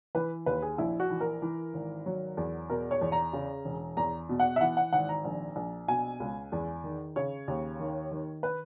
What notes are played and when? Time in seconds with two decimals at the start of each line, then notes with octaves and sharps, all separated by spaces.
0.15 E3 B4
0.46 D#2 B4
0.62 G#4
0.78 A#1 E4
1.00 F#4
1.10 E3
1.21 A#4
1.42 E3
1.74 G#1
2.06 F#3
2.37 E2
2.69 B2 A#4
2.91 C#5
3.01 E2
3.12 A#5
3.33 C#3
3.65 E1
3.97 E2 A#5
4.29 B2
4.40 F#5
4.56 E5
4.61 E3 F#5
4.77 F#5
4.93 G#1 F#5
5.09 A#5
5.25 A#1
5.56 A#1
5.88 B2 G#5
6.20 C#2
6.52 E2
6.84 D#3
7.16 C#3 C#5
7.48 D#2
7.80 D#3
8.11 D#3
8.43 B4